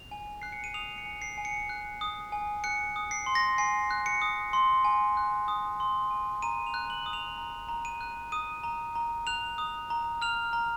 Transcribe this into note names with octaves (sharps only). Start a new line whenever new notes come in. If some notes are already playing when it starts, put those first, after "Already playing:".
Already playing: F7
G#5
F#6 C7
C#7
D#7
D#6 F7
C#7
G#5
C7
G#5
C#7
F#6
D#6
G#5
F#6 C#7
D#6
C7
C6
A#6
G#5 C7
F#6
C#7
D#6
C6
G#5
F#6
D#6
C6
G#5
A#5 D#7
F7
F#6
F#7
D#6
F7
A#5
A#5
D#7
F#6
D#6 D#7
A#5
A#5
F#6 F7
D#6
A#5
F6 F7
A#5